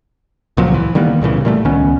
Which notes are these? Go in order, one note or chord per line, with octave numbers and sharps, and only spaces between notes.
C#2 A#2 F3 F#3
E3
D#3 G3 A#3 B3
C2 A#2 C#3 E3
A#2 G3 A3
C#2 D#3 B3 C#4